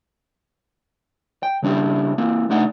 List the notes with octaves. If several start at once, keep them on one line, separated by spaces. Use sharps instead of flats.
G5
C#3 G3 D4 E4 G4
A#3 C4 E4
C2 A3 D4 D#4 F#5